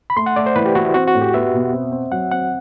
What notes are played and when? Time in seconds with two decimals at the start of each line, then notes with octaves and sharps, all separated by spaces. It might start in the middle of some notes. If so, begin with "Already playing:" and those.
0.10 B5
0.16 A3 C6
0.26 F#5
0.36 A3 D5
0.46 C5
0.56 E3 B4
0.65 G4
0.75 E3 F#4
0.84 E4
0.94 C4 F#4
1.07 F#4
1.14 A2
1.21 G4
1.34 B3 E5
1.54 B2
1.73 C4
1.92 C4
2.12 F#3 F#5
2.31 C4 F#5